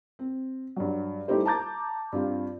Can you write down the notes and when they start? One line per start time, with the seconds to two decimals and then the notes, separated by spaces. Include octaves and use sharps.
0.19 C4
0.76 G2 F#3
1.28 G3 A3 D#4 E4 G4 C5
1.46 A5 A#5 D6 G6 A6
2.12 G2 C4 F4 G4